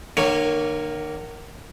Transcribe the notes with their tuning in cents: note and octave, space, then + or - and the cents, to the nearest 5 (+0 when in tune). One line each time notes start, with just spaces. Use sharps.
D#3 -45 A#3 +0 C#5 +0